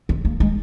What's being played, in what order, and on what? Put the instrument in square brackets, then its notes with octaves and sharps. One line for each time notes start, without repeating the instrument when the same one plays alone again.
[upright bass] C4
A#3
G#3